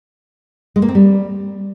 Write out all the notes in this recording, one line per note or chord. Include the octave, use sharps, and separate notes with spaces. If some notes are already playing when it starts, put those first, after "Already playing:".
G#3
A#3
C4
G3